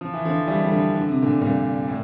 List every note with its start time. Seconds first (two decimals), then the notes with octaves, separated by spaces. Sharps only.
0.01 F3
0.14 E3
0.25 D3 F3
0.47 E3 G3
0.59 G3
0.71 D3 F3
0.95 D3
1.09 C3
1.22 A#2 D3
1.41 G2 A#2
1.88 A2